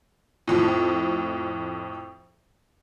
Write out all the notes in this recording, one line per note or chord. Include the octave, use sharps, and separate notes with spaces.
F2 A2